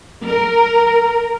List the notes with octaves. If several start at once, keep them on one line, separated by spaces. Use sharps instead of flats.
A#4